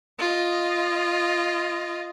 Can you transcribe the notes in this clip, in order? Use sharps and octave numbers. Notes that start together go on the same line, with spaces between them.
F4 D#5